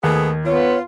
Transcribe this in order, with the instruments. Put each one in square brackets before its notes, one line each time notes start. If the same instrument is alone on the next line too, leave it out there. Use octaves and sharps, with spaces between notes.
[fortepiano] D#2 [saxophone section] A3 B3 G#4
[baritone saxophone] B3 [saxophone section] F4 [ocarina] C#5